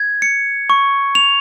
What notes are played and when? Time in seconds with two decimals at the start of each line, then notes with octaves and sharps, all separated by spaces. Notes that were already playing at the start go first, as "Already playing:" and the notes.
Already playing: G#6
0.22 C#7
0.70 C#6
1.15 F7